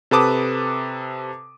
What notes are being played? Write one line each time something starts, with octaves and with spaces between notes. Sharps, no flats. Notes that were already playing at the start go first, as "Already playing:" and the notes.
C3 A4 B4 A5 D6 D#6